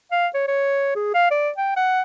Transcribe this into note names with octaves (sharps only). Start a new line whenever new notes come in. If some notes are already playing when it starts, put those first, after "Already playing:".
F5
C#5
C#5
G#4
F5
D5
G5
F#5